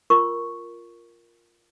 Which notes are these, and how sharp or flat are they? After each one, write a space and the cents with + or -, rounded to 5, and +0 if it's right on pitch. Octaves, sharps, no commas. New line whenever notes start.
F4 +0 A#4 +0 C#6 +0